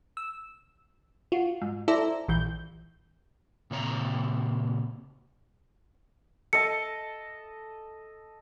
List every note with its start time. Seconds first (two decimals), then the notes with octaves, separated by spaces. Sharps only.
0.17 E6
1.32 F4 F#4
1.61 G#2
1.88 E4 A4 C5 D5 E5 A#5
2.28 A#1 E3 G6
3.71 A#2 C#3 C4 C#5 A#5
6.53 A4 D#5 A5 C#7